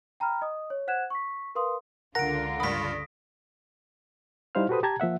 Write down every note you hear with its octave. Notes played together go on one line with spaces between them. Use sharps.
G5 A#5 B5 F6
D#5 D#6
C#5
C5 F#5 F#6 G#6 E7
C#6 B6
A#4 B4 F5 C6 D#6
C#2 D3 F4 A#4 F#5 A#5 A#6 D7
G2 B5 D#6 B6
G3 D#4 E4 C5 F5 F6
F#4 G4 A4 B4 C5 D#6
G4 A5 A#5 G#6
F3 A#3 E5 F#5